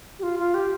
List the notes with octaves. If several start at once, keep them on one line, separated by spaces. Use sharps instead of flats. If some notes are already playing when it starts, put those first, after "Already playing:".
G4
F4
F4
G4